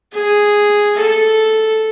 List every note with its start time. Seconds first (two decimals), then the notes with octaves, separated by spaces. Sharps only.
0.13 G#4
0.96 A4